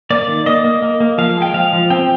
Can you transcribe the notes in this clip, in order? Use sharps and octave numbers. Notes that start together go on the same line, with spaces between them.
A#3 D5
D#3
A#3 D#5
A#3
A#3
A#3
F3 F5
G#3
G5
F3 F5
F3
C4 G5